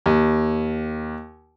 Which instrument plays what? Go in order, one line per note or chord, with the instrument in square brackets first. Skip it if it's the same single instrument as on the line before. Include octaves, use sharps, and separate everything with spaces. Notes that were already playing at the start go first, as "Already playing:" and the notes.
[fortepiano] D#2